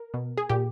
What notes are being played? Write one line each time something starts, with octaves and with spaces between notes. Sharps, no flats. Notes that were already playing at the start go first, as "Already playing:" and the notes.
Already playing: A#4
B2
G#4
A#2 G4